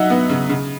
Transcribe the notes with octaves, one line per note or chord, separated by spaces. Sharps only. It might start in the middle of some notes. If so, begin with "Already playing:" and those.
Already playing: F#3 D#4 E5 F#5
B3
C#3
C#3